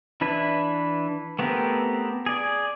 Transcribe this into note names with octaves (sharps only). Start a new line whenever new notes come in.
E3 D4 E4 B4
A3 B3 C4 G4 A#4
G#4 D5